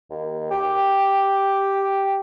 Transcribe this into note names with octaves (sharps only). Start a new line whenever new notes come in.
D#2
G4